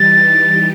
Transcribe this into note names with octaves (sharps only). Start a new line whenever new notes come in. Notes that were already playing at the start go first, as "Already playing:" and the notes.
Already playing: E3 G3 D#4 G4 A6